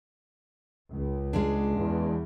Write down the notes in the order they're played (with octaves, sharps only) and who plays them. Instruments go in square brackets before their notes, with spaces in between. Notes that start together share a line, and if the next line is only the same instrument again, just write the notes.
[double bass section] C#2
[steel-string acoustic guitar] G#3 C#4 D4
[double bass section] E2